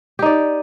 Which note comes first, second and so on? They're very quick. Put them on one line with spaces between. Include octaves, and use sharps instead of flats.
G4 D#4 D5